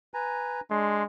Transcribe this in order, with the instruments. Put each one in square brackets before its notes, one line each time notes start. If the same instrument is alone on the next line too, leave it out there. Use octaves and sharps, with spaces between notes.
[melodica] B4 G#5 A#5
[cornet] G#3 [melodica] D4 C6